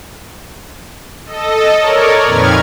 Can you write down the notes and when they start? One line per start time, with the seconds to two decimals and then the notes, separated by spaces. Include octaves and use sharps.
1.26 A4 D#5
1.79 A#4 C#5 D5
2.25 F2 A#2 D#3 B4 F6 G#6